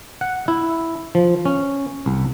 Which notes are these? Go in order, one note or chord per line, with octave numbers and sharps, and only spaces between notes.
F#5
E4
F3
C#4
C2